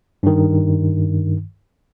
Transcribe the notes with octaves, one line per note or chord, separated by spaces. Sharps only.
G2 D#3